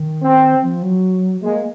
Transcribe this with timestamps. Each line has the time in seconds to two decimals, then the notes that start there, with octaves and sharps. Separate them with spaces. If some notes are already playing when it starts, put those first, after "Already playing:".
Already playing: D#3
0.22 C4
0.62 F3
0.83 F#3
1.43 G#3 A#3